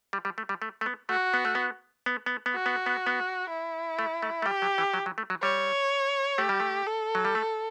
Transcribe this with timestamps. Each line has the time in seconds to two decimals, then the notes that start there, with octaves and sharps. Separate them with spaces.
0.13 G3
0.25 G3
0.38 A3
0.49 G3
0.62 A3
0.81 A3
0.86 B3
1.09 A3 F#4
1.34 B3
1.45 A3
1.55 B3
2.06 B3
2.26 B3
2.46 B3
2.54 F#4
2.66 B3
2.86 B3
3.07 B3
3.50 E4
3.99 A3
4.22 A3
4.42 A3
4.46 G3 G4
4.62 F#3
4.78 E3
4.94 F#3
5.06 F#3
5.18 A3
5.30 F#3
5.42 G3 C#5
6.38 A3 G4
6.49 G3
6.60 A3
6.87 A4
7.15 F#3
7.25 G3
7.35 A3